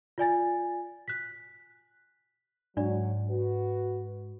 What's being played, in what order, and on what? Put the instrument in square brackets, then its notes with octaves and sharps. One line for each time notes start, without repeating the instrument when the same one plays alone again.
[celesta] F4 D5 G#5 A6
F#6 B6
[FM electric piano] G#2 [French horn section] F#3 [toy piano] D4 D5
[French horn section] F#4 B4